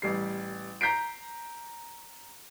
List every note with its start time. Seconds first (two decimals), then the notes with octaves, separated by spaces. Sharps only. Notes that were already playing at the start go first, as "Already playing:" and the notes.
0.02 A1 G3 C7
0.81 A#5 G6 B6 C7 D7